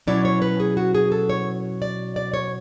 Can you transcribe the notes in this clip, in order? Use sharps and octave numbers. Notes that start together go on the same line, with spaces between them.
B2 F#3 C#4 E4 D5
C#5
B4
G#4
F#4
G#4
A4
C#5
D5
D5
C#5